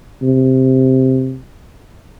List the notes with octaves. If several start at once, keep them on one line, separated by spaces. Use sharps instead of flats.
C3